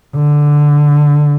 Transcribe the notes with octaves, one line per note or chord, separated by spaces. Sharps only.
D3